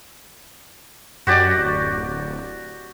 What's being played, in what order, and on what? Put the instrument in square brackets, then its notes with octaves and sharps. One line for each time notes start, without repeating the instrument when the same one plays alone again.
[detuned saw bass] F#2 [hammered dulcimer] F#4 G4 D5
[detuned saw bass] D1